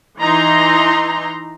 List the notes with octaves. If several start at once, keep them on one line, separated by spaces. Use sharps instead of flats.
E3 D#4 A#5 C6